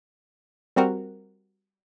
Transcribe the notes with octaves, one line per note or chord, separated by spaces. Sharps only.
G3 C4 F#4 A#4